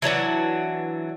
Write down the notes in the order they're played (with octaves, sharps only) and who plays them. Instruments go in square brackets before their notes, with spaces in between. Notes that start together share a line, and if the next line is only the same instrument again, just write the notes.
[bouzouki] E3 F#3 D4 F#4